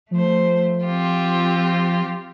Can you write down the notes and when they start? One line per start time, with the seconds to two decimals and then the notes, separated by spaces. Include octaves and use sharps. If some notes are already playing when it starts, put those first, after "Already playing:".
0.11 F3 A3 C5
0.85 C4 F4 G4